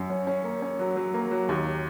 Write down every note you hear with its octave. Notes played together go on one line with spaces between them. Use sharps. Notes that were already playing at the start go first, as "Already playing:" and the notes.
Already playing: F#2
C#4
C#4
A#3
C#4
F#3
F#3
A#3
F#3
D#2